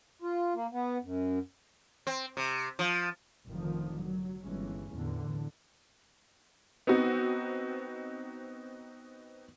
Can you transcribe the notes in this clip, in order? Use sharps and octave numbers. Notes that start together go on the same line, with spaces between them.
F4
A#3
B3
F#2
C4
C3
F3
F1 D3 D#3 F3
F#3
G1 E3 G#3 C#4
E2 A2 D3
B3 C4 D#4 F#4 C#7